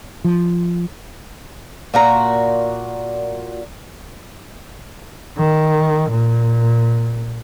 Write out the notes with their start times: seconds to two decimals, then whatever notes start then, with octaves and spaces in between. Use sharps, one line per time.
0.24 F3
1.94 A#2 F#4 A#5
5.38 D#3
6.10 A#2